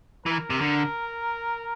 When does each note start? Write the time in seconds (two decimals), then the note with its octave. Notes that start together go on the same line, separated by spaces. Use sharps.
0.26 E3 A#4
0.50 C3
0.61 D3